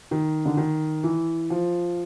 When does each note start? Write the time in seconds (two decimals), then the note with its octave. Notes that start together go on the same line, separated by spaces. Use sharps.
0.11 D#3
0.45 D3
0.57 D#3
1.04 E3
1.50 F3